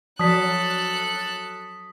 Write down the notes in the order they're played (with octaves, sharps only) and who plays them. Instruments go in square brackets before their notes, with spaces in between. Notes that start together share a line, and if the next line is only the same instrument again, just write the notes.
[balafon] F3 D5 A5 [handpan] F#3 [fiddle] A4 F#6 [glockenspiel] D#6 B6